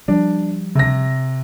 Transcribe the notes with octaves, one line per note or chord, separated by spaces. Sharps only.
F3 G3 D4
C3 A#6